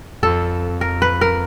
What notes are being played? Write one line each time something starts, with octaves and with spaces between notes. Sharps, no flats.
F2 A4
A#4
B4
A#4